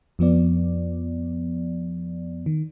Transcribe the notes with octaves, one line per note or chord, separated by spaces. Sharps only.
F2 F3 B3 D5
D#3